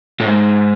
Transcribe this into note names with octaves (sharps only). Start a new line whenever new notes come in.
A2
G#2